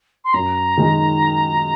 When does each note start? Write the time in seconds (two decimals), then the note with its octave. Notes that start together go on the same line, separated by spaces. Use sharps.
0.25 C6
0.34 F#2 A#5
0.77 D#3 G#3 D#4 G#4